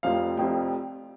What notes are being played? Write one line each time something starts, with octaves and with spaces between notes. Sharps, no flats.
F1 F2 C3 F3 F5
F1 F2 C3 F3 G5